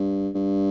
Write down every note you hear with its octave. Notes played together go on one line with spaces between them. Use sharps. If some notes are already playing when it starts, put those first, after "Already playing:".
Already playing: G2
G2